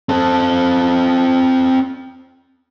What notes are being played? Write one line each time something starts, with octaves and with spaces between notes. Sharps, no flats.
C4 A4